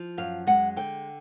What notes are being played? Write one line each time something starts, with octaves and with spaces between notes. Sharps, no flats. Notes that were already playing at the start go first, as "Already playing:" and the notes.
Already playing: F3
F#2 F5
G#3 F#5
D3 G5